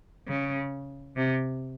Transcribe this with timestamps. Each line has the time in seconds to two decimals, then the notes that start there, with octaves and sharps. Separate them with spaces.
0.28 C#3
1.16 C3